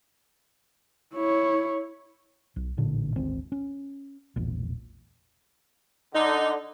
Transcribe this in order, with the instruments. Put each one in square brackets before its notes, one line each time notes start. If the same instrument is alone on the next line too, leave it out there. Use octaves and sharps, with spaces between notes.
[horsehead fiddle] E4 C#5
[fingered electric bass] B1
A1 A#2 D3
D1 G#1 C4
C#4
E1 A#1
[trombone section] D3 [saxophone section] D#4